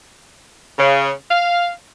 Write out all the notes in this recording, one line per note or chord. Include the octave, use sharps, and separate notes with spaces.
C#3
F5